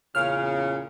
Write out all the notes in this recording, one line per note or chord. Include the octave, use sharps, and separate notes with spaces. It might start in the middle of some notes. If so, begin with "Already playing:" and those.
E2 A#2 C#3 F6